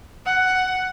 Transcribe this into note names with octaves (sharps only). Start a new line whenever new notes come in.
F#5